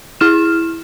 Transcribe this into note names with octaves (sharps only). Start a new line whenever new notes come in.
E4 F6 E7